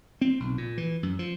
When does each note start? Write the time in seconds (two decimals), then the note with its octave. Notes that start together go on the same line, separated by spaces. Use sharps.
0.21 C4
0.40 B1
0.58 A#2
0.77 E3
1.03 F#2
1.19 F3